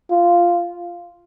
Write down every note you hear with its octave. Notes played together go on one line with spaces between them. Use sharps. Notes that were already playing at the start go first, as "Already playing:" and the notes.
F4